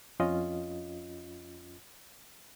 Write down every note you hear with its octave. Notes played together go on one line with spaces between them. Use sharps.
F2 C#4 F4 D#5